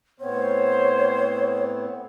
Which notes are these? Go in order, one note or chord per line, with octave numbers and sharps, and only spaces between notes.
A2 B3 C4 C5 C#5